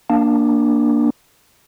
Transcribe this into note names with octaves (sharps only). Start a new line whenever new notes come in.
A#3 D4